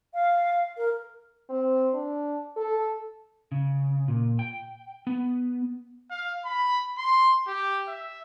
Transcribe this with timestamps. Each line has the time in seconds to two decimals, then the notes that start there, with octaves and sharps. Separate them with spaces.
0.14 F5
0.77 A#4
1.50 C4
1.94 D4
2.56 A4
3.52 C#3
4.08 A#2
4.39 G5
5.07 B3
6.11 F5
6.45 B5
6.98 C6
7.47 G4
7.88 E5